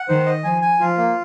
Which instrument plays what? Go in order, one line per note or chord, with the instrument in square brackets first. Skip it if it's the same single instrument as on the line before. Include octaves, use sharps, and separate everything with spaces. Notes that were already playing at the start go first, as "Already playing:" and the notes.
Already playing: [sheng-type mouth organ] F#5
[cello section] D#3 [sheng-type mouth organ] C5
[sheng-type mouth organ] D#5
[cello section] F3 [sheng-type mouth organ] G#5
[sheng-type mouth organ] G#5
[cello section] F3 [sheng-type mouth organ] F4
[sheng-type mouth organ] A#3